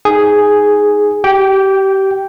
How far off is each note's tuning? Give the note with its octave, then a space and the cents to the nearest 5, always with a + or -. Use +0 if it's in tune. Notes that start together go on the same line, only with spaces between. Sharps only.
D#4 +0 G#4 +0
G4 -25 G5 +0